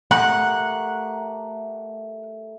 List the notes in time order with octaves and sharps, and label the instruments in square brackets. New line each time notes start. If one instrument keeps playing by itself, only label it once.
[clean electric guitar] A3 G4 A#4 [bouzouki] F#5